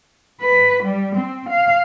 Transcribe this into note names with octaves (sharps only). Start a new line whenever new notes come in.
B4
G3
C4
F5